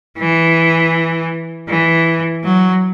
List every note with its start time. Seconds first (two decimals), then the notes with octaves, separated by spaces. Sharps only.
0.19 E3
1.69 E3
2.44 F#3